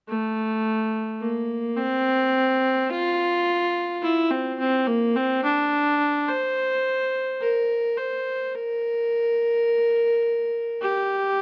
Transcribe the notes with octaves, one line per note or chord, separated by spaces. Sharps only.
A3
A#3
C4
F4
E4
C4
C4
A#3
C4
D4
C5
A#4
C5
A#4
G4